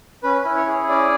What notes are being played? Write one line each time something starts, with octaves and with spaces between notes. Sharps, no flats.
C#4 B4
E4
C#5
G#4
C#4 D5